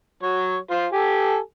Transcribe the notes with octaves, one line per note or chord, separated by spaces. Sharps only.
F#3 C#5
F4 C5
G4 A4 G#5